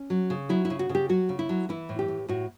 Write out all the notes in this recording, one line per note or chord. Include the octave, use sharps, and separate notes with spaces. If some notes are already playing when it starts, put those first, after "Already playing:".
Already playing: C#4
F#3
C#3
F#3 E4
E4
C#3
F#4
C#3
G4
F#3 F#4
C#3
E4
F#3
E3 E4
A2
G4
A2
A2 F#4